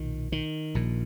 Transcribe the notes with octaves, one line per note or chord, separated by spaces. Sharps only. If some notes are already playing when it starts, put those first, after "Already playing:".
Already playing: B1 A#2 D#3
D#3
A#1 A#2